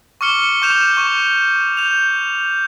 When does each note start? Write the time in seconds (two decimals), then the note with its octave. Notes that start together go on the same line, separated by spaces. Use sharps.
0.21 C#6 D6 F6 C#7 G7
0.62 C#6 F6 G6 E7 F7
0.97 C#6
1.77 G6 F7